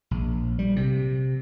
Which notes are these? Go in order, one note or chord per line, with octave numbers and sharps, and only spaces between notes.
A#1
G3
C3